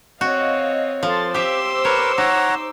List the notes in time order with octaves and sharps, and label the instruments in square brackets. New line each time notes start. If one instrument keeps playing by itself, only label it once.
[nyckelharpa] C4 C#5 [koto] F#4 [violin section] D#5 F5
[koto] F3 [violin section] A4 C6 A6
[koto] G4 E5 [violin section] C5 D6 E6 [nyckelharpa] C6
[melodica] A#4 B4 [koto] C#5
[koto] D#4 [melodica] C#5 F#5 A#5